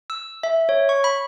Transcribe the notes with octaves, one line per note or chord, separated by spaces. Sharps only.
E6
E5
C#5
C#6
B5